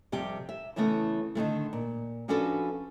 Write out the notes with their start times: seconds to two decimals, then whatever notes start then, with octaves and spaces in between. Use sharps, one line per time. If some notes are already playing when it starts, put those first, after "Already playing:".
0.12 F2 C3 G3 G4
0.49 E5
0.76 C#3 E3 G3 A3 B3 C#4
1.35 D3 D#3 G#3 A3
1.73 A#2
2.28 F3 C#4 D4 F#4 A4 B4